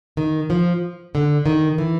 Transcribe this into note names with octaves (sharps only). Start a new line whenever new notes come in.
D#3
F3
D3
D#3
E3